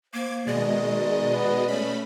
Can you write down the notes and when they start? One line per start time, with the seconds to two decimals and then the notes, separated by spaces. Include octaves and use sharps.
0.14 A#3 C5 D6 G#6
0.47 B2 D#3 G#3 D5 D#5
1.33 B3
1.68 A3 C#4 B5